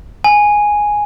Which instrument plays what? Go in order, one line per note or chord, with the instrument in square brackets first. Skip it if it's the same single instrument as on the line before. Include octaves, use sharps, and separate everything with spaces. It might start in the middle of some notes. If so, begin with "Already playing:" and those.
[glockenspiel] G#5